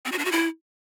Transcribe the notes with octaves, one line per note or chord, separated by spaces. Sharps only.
C4
F#4
D4
F#4
E4